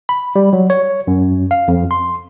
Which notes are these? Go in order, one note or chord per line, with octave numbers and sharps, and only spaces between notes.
B5
G3
F#3
C#5
F#2
F5
F2
C6